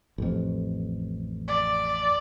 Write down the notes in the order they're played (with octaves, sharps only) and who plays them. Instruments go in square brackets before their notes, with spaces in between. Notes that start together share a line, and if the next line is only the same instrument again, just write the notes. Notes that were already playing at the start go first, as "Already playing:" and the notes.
[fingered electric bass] A1 F2
[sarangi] D5